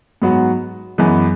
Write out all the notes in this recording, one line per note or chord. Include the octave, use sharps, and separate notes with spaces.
G#2 F#3 B3 F#4
F#2 E3 G#3 B3